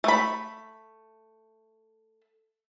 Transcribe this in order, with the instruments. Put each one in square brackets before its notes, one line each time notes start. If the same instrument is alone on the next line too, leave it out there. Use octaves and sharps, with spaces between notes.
[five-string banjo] A3 B5